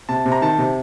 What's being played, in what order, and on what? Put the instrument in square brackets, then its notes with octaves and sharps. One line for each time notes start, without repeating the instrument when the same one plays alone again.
[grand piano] C3 A5
C3
A#5
D#3 A5
C3